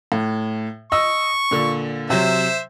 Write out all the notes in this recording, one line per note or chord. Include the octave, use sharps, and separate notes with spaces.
A2
D#5 C#6 E6
A#2 D3
C3 F#3 C5 E5